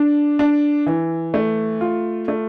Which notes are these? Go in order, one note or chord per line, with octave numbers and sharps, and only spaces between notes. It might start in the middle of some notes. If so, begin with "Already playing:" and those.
Already playing: D4
D4
E3
A3
F4
A3